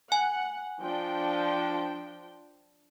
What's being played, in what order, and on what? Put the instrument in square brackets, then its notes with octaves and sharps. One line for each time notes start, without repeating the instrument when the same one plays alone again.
[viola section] F#5 [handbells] G#5
[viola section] F3 D4 G5